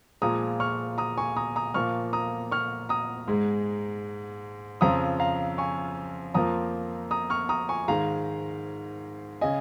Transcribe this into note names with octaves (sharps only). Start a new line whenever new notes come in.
A#2 F3 G#3 A#5 D#6
C#6 F6
A#5 D#6
G#5 C#6
A#5 D#6
A#5 D#6
A#2 F3 A#3 C#6 F6
A#5 D#6
C#6 F6
A#5 D#6
G#2 G#3
F2 C#3 F3 A#5 D#6
F5 A#5
G#5 C#6
F2 F3 A#3 A#5 D#6
A#5 D#6
C#6 F6
A#5 D#6
G#5 C#6
G#2 D#3 G#3 F5 A#5
C#3 D#5 G#5